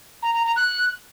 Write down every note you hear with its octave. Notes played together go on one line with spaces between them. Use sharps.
A#5
A#5
A#5
F#6